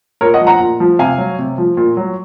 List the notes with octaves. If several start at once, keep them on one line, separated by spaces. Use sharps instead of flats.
A#2 A#4 C#5
D#5 F#5
F3
F#5 A#5
A#2
F3
C3 F5 G#5
F#3
C3
F3
A#2
F#3